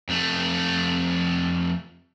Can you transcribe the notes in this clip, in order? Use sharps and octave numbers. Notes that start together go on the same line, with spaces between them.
F2 A3